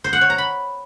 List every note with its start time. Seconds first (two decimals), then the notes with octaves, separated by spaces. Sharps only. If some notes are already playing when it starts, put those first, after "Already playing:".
0.04 C5
0.13 F#5
0.21 C#5
0.30 A#5
0.38 B5